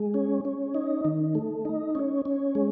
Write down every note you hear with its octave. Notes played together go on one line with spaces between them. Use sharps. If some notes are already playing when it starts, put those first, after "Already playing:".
Already playing: G#3
C#4
C#4
D#4
D#3
A3
D#4
C#4
C#4
G#3